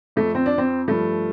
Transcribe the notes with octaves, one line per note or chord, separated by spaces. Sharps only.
F2 F3 A3
C4
D4
C4
G2 F3 A3